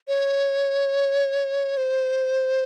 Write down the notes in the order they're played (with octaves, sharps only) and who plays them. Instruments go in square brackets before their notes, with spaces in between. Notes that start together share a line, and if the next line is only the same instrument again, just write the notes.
[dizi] C#5
C5